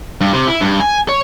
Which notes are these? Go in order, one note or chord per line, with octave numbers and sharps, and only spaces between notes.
G2
C3
E4
G2
G#5
C#5